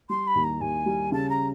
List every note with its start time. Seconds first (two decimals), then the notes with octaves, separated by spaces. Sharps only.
0.09 G3 C6
0.27 B5
0.35 D#2
0.43 A#5
0.60 D#2 G#5
0.86 G3
1.12 C#3 A5
1.29 A#5